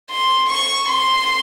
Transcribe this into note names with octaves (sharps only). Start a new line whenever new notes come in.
C6
C#6
C6